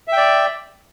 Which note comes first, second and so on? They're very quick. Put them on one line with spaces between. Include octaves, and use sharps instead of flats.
E5 G5 D5